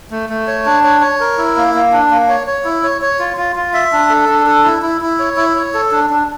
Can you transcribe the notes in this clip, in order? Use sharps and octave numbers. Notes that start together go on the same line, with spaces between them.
A3
A3
C#5
D4
C#5
C#5
A#4
E4
A#3
A#3
D4
A#3
C#5
C#5
E4
C#5
C#5
F4
F4
F4
E5
D4
A4
D4
A4
E4
E4
E4
C#5
E4
C#5
A4
D4
D4